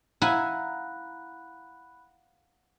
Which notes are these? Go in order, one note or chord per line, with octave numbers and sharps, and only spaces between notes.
E4 F5 F#5 G#5 A#5 B5 F#6